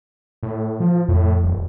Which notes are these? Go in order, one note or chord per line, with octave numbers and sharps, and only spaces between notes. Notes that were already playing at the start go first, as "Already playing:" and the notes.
A2
F3
F2 A2
D#1